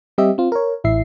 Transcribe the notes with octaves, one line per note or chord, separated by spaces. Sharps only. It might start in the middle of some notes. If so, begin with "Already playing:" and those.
G3 C4 G4 D#5 E5
C4 F4
A#4 C#5
A1 E4 E5 C7